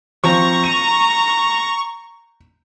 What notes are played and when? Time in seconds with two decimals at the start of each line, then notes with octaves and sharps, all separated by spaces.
0.24 F3 C4 A#5 C#6
0.64 D#7